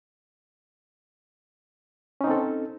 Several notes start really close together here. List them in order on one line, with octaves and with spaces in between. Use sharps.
C#4 D#4 C4 A4